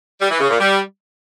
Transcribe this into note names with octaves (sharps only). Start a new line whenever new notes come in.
G3
E3
C#3
A#2
G3